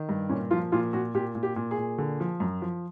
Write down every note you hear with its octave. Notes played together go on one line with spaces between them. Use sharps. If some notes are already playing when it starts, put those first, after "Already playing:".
Already playing: D#3
G2
A#2 C#4
F3 F4
A#2 F4
A#2 F#4
A#2 G4
A#2
G4
A#2
G#4
A#2
D3
F3
F#2
F3